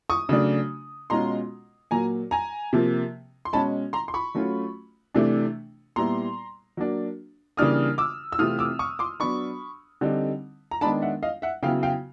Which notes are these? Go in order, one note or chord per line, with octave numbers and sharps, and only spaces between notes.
C#6 D#6
C#3 F#3 A3 D4
B2 G#3 C#4 F4 A#5 C6
A#2 F#3 A#3 G#5 A#5
G#5 A#5
C3 F3 A#3
C6
B2 G#3 C#4 A5 B5
A#5 C6
C6
B5 C#6
F#3 A3 C#4 F4
C3 E3 A3 D4
A#2 G3 B3 E4 A#5 C6
F#3 A#3 D4
C#3 E3 G3 A#3 D4 D#6 F6
D6 E6
E6
C3 E3 A3 C4 F4 D#6 F6
D6 E6
C#6 D#6
C6 D6
F#3 B3 D4 B5 C#6
D3 G3 C4 D#4
A#5
D#3 G#3 B3 D4 A5 B5
E5 F#5
D#5 F5
E5 F#5
C#3 F#3 B3 E4 F5 G5
F5 G5